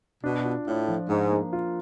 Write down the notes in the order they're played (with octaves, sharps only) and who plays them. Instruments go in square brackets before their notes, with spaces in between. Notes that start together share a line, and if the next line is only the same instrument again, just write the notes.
[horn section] B2 [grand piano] D4
[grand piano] F4
[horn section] A2 [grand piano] F4
[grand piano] F3
[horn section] G#2 [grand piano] D4
[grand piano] A#3
F4